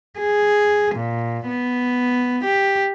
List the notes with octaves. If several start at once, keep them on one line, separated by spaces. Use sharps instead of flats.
G#4
A#2
B3
G4